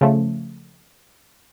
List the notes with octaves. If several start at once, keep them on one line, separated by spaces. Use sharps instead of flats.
C#3 F3 A3